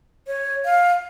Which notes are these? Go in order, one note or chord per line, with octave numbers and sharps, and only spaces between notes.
C#5
F5